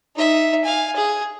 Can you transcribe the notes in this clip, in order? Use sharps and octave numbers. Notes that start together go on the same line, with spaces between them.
D#4 E5
F5 G#5
G#4